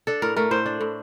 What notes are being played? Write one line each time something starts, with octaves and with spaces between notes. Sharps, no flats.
D4 A4
A2 A#4
A3 A#4
A2 C5
D4
A2